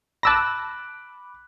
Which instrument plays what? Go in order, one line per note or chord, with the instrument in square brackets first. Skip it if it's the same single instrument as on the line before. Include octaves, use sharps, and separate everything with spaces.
[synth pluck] A5 E6 A#6 [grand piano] B5 D6 F#6